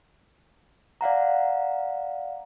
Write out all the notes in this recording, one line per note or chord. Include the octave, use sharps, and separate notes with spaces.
D5 F5 F#5 A#5